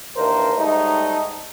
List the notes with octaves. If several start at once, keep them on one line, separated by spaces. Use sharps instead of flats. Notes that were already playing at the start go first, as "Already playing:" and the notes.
D#2 E3 D4 A#4 C5
G#2 G3 A3 D#4